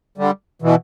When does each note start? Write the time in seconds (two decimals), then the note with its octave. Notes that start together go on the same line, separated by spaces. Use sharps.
0.18 D3 G3
0.62 B2 E3